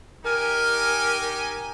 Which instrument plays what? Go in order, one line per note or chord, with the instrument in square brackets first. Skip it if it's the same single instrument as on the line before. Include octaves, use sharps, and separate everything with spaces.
[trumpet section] D#4 G4 G#5 [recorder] A#4